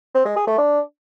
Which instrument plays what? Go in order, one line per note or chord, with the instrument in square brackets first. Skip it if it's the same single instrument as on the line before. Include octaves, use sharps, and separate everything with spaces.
[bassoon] C4
G#3
G#4
A3
D4